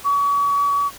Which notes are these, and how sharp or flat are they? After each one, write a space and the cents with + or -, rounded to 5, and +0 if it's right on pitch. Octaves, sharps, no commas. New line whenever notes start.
C#6 +40